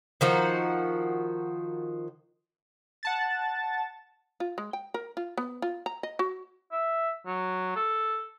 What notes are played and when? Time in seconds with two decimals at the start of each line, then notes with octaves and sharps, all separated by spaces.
0.21 D#3 F3 F#4
3.03 F#5 A5 A6
4.40 F4
4.58 G#3
4.73 G5
4.94 A#4
5.17 F4
5.37 B3
5.62 F4
5.86 A#5
6.03 D#5
6.19 F#4
6.72 E5
7.26 F#3
7.76 A4